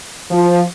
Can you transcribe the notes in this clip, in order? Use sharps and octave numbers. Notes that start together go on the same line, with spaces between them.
F3